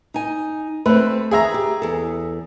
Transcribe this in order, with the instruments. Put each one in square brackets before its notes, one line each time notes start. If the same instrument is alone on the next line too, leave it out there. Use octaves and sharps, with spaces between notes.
[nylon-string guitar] D#4 G#5
[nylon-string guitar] A3 [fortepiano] C4 B4
[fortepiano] G#4 E5 A#5
[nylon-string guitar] G4
E2 A4